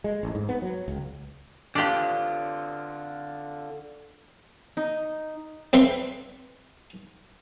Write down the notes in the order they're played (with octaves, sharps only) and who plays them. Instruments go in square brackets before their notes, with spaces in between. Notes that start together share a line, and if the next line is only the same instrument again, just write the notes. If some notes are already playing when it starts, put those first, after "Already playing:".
[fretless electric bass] G#3
A1
G#2
B3
F#3
C#2
[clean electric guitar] D3 F4 [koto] D4 G4
[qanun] D#4
[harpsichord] C4 B4 E5 C6